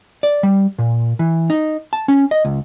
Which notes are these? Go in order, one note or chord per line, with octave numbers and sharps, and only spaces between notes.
D5
G3
A#2
E3
D#4
A5
C#4
D#5
C#2